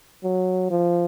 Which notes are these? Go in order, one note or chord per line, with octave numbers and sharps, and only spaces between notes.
F#3
F3